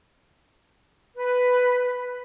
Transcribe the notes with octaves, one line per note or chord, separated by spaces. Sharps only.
B4